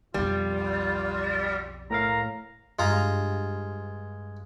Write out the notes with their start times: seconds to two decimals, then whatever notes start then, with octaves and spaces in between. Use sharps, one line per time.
0.14 B1 F2 G3 F4
1.90 A2 A#4 F5 A#5
2.79 G2 G#3 F4 A#5